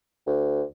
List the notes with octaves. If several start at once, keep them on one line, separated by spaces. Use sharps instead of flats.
D2